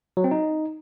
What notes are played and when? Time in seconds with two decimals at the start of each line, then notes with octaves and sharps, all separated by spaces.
0.17 F#3
0.24 C4
0.31 D#4